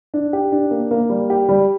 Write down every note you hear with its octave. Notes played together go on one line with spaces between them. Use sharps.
D4
G4
D4
A#3
A#3
G3
G4
G3